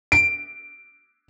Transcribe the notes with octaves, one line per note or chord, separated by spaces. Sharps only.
D7